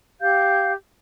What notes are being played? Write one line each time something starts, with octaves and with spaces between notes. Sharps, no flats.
G4 F5 G6